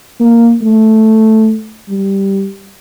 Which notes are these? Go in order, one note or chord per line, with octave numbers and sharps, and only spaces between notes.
A#3
A3
G3